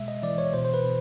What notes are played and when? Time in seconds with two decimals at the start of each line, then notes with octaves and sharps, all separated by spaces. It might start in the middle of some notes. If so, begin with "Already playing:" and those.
Already playing: B2 G#3 E5
0.08 D#5
0.23 E3 D5
0.38 C#5
0.53 B2 C5
0.65 C5
0.74 B4
0.84 B2